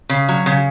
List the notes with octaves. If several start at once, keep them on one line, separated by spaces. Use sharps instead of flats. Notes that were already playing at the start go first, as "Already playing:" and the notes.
C#3
F#3
C#3